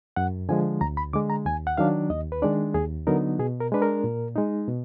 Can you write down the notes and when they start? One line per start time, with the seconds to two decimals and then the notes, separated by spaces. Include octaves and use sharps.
0.16 F#2 F#5
0.49 D3 F3 G#3 G#5
0.81 D2 A#5
0.97 B5
1.13 D3 G#3 D6
1.30 A#5
1.46 D#2 G#5
1.67 F#5
1.78 D#3 F#3 D4 F5
2.10 D#2 D#5
2.32 B4
2.42 D#3 G#3 D4 D5
2.74 D#2 G#4
3.07 D3 F#3 B3 D#4 A#4
3.39 B2 G#4
3.60 A#4
3.72 G#3 D4 B4
3.82 A#4
4.04 A#2
4.36 G#3 D#4
4.68 B2